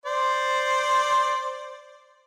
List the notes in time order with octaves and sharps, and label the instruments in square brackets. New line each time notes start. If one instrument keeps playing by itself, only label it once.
[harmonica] C5 D5